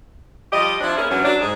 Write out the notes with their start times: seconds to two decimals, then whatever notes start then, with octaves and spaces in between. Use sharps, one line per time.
0.53 F3 G3 G4 D#5
0.81 F3 C4 D4 E4 G4 C5
0.97 A#3 B3 C#4 E4 G#4
1.10 G2 D3 E3 F#3 C#4
1.25 F#3 D4
1.40 G#2 G#4